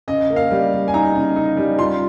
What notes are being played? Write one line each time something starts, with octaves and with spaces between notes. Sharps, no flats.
C#3 D#5
A#3
F5
G3
G3
G#5
D#4 A#5
C#3
D#4
G3
F4 C6